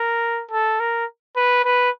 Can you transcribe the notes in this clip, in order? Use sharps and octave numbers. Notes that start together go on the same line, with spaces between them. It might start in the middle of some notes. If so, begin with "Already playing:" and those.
Already playing: A#4
A4
A#4
B4
B4